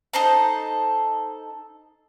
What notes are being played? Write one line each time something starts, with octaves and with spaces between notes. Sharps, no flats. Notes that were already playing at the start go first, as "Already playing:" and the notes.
D#4 A4 C5 A#5